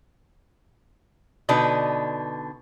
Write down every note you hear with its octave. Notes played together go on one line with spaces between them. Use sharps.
B2 D3 D4 D#4 B4